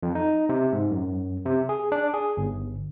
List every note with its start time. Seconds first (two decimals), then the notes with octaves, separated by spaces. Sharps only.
0.03 F2
0.15 D#4
0.49 C3
0.72 G#2
0.91 F#2
1.46 C3
1.69 G#4
1.92 D4
2.14 G#4
2.37 G1